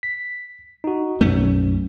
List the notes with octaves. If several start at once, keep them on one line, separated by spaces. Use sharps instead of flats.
B6
D#4 F#4
B1 F#2 A3 C#4